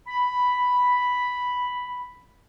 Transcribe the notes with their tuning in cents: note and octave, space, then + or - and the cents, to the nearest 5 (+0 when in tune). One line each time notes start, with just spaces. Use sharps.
B5 +0